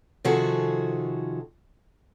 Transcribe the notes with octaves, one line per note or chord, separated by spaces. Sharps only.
C3 D#3 F3 F#4 G#4 A4